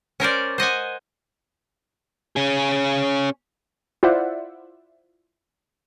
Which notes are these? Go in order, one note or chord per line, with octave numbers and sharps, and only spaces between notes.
C#4 A#4 C5 D5
C5 D#5 F#5 G#5
C#4 G#4
E4 F4 C5 D5 E5 F#5